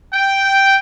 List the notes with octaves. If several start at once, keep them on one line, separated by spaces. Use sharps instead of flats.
G5